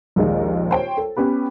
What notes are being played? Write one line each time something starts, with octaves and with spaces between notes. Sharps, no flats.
A#1 D#2 G#3 D#4
C5 C#5 G5
A4
B3 C#4 G4 B4